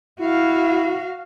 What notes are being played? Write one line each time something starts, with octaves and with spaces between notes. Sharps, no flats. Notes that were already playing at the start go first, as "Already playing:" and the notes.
E4 F#4 F5